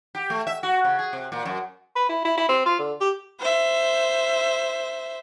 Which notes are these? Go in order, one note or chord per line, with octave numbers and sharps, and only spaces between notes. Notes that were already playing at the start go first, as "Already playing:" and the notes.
G4
A3
E5
F#4
C#3
G#4
C3
A#2
F#2
B4
E4
E4
E4
C4
F4
D3
G4
C5 E5